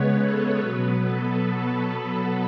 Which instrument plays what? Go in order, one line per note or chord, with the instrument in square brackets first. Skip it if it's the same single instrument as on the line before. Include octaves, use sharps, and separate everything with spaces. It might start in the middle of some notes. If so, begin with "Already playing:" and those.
Already playing: [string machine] C#3 G#3 B3 B4 C#5
A4
B2 F#3 B3 B4
A4
A4